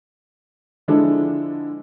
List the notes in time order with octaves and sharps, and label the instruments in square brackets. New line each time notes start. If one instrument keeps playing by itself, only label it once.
[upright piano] D3 F3 G#3 D4 E4 A4